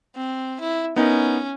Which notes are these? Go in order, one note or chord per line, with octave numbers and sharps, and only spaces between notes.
C4
E4
B3 C#4 D#4 A#4